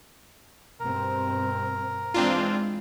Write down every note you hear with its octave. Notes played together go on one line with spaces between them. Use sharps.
G2 B2 C4 A#4
E3 G#3 C4 D4 F4